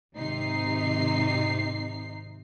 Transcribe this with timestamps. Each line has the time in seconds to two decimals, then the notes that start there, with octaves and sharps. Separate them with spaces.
0.16 G#1 C3 D#4 C7